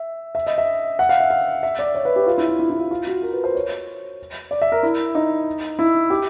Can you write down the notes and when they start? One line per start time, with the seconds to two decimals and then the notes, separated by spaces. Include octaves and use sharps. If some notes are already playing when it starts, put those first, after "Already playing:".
Already playing: E5
0.35 E5
0.47 D#5
0.58 E5
0.99 F#5
1.09 F5
1.20 E5
1.30 F5
1.63 E5
1.79 D5
1.95 C#5
2.05 B4
2.16 G4
2.26 F4
2.38 E4
2.48 E4
2.59 E4
2.70 E4
2.80 F4
2.91 F4
3.07 F#4
3.22 A#4
3.33 B4
3.44 C5
3.55 C#5
4.51 D5
4.62 E5
4.72 A#4
4.83 E4
5.15 D#4
5.79 E4
6.10 G4